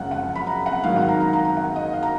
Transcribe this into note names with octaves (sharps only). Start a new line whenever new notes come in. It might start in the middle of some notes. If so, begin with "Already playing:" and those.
Already playing: F#2 C#3 F3 G#3 F#5
F#5
B5
A#5
F#5
G#2 D#3 F#3 F5
F#5
A#5
A#5
A#5
A#5
F#5
D#5
F5
A#5